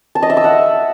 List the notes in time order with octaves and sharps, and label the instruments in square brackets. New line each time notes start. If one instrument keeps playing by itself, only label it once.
[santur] A5
D#5
E5
E6
F#5